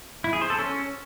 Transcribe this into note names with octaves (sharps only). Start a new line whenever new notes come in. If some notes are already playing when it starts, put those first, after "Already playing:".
E4
G#4
C5
A4
C#4